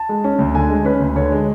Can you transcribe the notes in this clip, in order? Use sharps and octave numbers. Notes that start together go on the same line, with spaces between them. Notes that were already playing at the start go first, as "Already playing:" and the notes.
Already playing: A5
G#3
C#4
D2
D3 G#5
G#3
C#4 B4
D2
D3 C#5
G#3